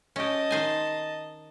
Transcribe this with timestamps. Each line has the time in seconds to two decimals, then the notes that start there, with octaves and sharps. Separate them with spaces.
0.16 C#4 G4 D#5 A5
0.51 D#3 C5 G#5